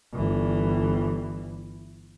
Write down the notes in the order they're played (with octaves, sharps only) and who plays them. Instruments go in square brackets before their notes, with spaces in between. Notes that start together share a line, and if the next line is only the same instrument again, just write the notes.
[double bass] G1 E3